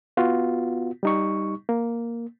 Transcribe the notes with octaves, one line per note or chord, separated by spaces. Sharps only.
B3 F4 F#4
G3 D#4 C#6
A#3